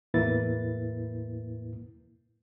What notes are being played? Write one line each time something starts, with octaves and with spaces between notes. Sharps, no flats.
E2 A2 A#3 E4 B4 A6